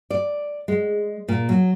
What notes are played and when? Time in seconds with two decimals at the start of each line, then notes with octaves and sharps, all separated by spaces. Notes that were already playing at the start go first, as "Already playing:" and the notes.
0.10 D5
0.68 G#3
1.28 A#2
1.49 F#3